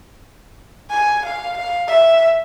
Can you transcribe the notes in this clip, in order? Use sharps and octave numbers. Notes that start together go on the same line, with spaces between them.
G#5
F5
F5
E5